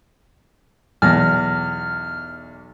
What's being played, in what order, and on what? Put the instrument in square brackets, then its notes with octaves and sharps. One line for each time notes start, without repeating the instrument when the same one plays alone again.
[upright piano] B1 A5 A#6 [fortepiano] E2 [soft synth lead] F6